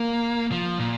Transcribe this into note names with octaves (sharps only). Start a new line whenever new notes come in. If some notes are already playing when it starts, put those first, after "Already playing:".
Already playing: A#3
F3
A#2